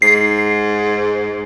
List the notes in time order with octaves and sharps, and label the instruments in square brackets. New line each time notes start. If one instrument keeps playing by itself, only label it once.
[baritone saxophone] G#2 [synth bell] C7